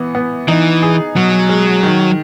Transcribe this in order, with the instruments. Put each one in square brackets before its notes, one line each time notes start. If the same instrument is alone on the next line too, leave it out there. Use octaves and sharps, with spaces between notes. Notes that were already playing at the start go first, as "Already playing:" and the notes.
Already playing: [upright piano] E3 B3
B3
[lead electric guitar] E3 [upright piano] D#4
[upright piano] G#4
[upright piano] B2 [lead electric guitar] F#3
[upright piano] G#3
D#3